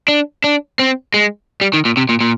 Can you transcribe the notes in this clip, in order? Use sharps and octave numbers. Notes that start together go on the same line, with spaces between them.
D4
D4
C4
G#3
G3
D#3
A#2
C3
A#2
A#2